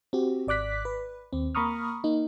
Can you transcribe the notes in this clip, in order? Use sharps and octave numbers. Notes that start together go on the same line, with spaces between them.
C4 F#4 G4
G#1 D5 D6 F#6 B6
B4
D#2 C4
A#3 A#5 B5 C#6 D#6 F6
A#3 D#4